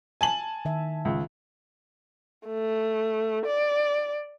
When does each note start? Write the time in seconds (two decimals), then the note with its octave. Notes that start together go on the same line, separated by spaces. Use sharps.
0.21 G#5 A5 F#7
0.65 D#3 E5
1.05 C#2
2.47 A3
3.46 D5